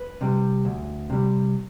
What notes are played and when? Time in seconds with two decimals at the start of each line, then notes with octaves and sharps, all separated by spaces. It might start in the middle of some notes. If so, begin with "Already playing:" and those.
Already playing: B4
0.21 C3 G3
0.65 D2
1.10 C3 G3